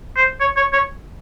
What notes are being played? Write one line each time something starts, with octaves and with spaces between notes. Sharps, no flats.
C5
C#5
C#5
C#5